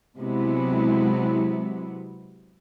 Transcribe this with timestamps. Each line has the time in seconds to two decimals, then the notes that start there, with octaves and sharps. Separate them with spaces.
0.17 C3 F#3 G#3 B3 E4